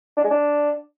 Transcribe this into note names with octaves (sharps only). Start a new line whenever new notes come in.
D4
G#3
D4